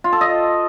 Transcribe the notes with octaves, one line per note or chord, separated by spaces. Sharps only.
F4
A4
D#5